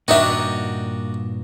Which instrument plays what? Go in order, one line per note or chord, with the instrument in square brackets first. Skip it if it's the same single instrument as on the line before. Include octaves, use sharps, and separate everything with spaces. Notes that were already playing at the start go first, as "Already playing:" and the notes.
[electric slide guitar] G2 A#2 [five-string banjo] D#3 E5 [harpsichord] D4 D#4 F#4